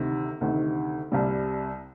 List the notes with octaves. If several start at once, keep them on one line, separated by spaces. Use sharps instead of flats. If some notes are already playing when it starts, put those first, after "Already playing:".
Already playing: D2 C3 D#3
D2 C3 D#3
C2 C3 G3